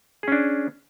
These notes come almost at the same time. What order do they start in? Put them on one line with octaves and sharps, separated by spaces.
G#4 C#4 D4